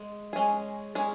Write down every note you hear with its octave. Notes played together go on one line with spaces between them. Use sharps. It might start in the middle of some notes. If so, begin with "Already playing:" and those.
Already playing: G#3
G#3 C#4 G#4
G#3 C#4 G#4